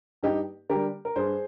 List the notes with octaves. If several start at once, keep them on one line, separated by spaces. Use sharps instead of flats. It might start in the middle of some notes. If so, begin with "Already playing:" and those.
G2 D#4 G4
D3 G3 G4 A#4
A#4
G2 G#4 C5